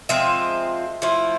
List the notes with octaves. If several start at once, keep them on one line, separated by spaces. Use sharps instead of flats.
F3 G#3 C4 E5
F3 A3 E4